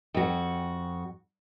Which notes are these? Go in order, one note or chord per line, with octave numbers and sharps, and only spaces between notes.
F2 F#4